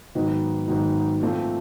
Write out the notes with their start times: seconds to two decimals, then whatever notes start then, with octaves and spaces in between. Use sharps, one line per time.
0.15 G#2 D#3 F#3 B3 D#4
0.67 G#2 D#3 F#3 B3 D#4
1.21 A#2 F3 A3 C4 F4